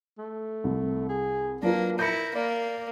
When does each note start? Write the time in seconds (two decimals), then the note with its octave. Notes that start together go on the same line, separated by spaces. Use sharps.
0.18 A3
0.64 C2
1.09 G#4
1.63 F#3 A#3 D4 F4 B4
1.99 E4 A#4 G6 A#6 C#7
2.35 A#3 D5